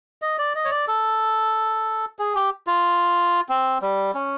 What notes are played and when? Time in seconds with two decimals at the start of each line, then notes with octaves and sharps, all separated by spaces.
0.22 D#5
0.38 D5
0.55 D#5
0.65 C#5
0.71 D5
0.88 A4
2.19 G#4
2.35 G4
2.67 F4
3.49 C4
3.82 G3
4.14 C#4